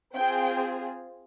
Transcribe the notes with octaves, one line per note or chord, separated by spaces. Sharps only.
C4 F4 G#4 G5